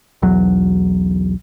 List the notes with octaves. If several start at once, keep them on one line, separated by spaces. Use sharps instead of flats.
B1 E2 F#3